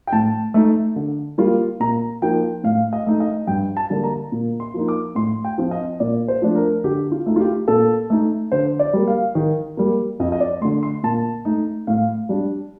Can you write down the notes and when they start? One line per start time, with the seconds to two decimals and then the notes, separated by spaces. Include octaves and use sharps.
0.07 G5
0.13 A2 A5
0.54 A3 D#4
0.96 D3
1.38 G3 A#3 F4
1.80 A#2 A#5
2.22 F3 A#3 D#4 G5
2.64 A2 F5
2.93 D#5
3.07 A3 D#4
3.20 D#5
3.47 G2 G5
3.77 A5
3.90 D3 G3 A#3 D4
4.04 A#5
4.32 A#2
4.60 C6
4.74 F3 A#3 D#4
4.88 D6
5.15 A2 C6
5.44 G5
5.58 F3 C4 F4
5.71 D#5
6.00 A#2 D5
6.28 C5
6.42 F3 A3 D4
6.55 A#4
6.84 D3 G4
7.12 F4
7.26 A3 D#4
7.36 F4
7.40 G4
7.68 A#2 A4
8.10 A3 D#4
8.52 D3 C5
8.79 D5
8.93 G3 A#3
9.07 F5
9.35 D#3
9.77 G3 A#3
10.19 F2 D#5
10.32 D#5
10.40 D5
10.61 A3 C6
10.65 D3
10.83 C6
11.03 A#2 A5
11.45 A3 D#4
11.87 A2 F5
12.29 G3 D4